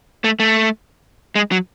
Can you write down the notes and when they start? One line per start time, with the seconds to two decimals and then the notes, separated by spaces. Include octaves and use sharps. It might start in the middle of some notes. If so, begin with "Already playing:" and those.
0.24 A3
0.40 A3
1.35 G#3
1.51 F#3